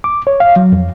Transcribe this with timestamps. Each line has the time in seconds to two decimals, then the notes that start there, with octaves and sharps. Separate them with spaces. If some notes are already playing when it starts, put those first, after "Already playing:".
0.04 D6
0.27 C#5
0.40 F5
0.56 F#3
0.72 F2